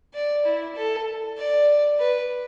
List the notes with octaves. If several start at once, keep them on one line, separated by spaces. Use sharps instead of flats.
D5
E4
A4
D5
B4